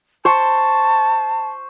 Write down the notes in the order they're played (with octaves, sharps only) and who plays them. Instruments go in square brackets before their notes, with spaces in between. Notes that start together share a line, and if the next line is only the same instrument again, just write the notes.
[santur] C5 C6 C#6 [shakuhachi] A5